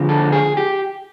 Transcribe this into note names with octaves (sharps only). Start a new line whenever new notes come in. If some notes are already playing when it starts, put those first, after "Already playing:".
Already playing: D3 F3 G#3
A4
G#4
G4